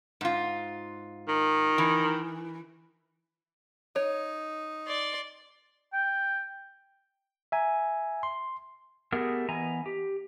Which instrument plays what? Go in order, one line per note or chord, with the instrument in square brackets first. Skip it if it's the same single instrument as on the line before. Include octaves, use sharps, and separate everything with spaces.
[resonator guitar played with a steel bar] G#2 F4
[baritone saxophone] D#3
[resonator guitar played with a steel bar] E3
[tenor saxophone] D#4 [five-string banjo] C#5
[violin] D5 C6
[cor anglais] G5
[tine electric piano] E5 G#5 A#5
C6
[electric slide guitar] A3 B3 G4 G#4 A#4
E3 B3 D#5 G#5 A#5
G4